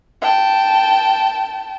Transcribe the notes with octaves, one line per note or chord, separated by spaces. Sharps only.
G5 A5